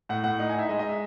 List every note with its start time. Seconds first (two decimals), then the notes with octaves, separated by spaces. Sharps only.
0.09 A2 F#5
0.24 A2 F#5
0.39 D#4 F#5
0.49 G#5
0.54 D#4 E5
0.69 G#3 D#5
0.79 D#5
0.84 D#4
0.89 E5